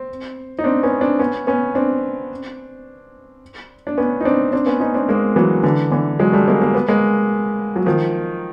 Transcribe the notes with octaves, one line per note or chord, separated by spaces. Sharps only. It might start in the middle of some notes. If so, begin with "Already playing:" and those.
Already playing: C4
D#4
C4 D4
B3 C#4
C4 D4
B3 C#4
B3 C#4
C4 D4
D4
B3 C#4
D#4
C4 D4
C4 D4
B3 C#4
C#4 D#4
C4 D4
G#3 A#3
E3 F#3
D3 E3
D3 E3
F#3 G#3
G3 A3
G#3 A#3
A#3
B3
G#3 A#3
F#3
D#3 F3